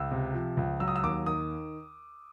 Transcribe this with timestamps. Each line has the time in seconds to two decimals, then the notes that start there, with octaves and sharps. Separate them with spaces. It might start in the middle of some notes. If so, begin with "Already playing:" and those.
Already playing: C#2 E6
0.11 C3
0.34 F3
0.57 C#2
0.80 F#3 E6
0.88 D#6
0.96 E6
1.03 D#2 D6
1.26 D#3 D#6